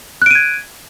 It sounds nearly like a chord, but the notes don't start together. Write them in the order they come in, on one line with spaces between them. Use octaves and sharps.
F#6 D7 D#7 G#6